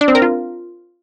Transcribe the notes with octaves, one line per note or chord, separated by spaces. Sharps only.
D4
C4
A#4
F4